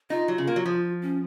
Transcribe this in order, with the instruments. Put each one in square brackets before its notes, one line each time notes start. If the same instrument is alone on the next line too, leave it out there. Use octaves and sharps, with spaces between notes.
[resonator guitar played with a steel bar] D#4 [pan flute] F4
[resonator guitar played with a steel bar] F#3
C#3
A#3
F#3
F3
[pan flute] C#4